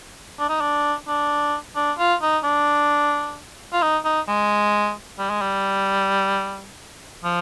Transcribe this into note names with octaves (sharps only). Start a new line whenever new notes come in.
D4
D#4
D4
D4
D4
F4
D#4
D4
F4
D#4
D#4
G#3
G3
G#3
G3
F3